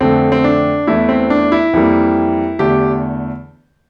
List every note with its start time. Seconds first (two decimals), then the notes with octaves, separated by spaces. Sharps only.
0.01 F2 D3 A3 C4
0.32 C4
0.44 D4
0.87 E2 E3 A3 E4
1.09 C4
1.30 D4
1.52 E4
1.73 F2 E3 G3 A#3
2.59 E2 D3 A3 G4